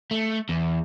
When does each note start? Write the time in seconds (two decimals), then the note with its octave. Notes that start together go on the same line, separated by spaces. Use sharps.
0.11 A3
0.49 E2